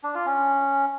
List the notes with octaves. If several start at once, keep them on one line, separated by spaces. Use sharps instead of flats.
D4
F4
C#4